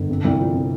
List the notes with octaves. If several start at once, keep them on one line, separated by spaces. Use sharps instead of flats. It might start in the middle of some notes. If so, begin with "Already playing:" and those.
Already playing: G1
C3
C2
F3
C3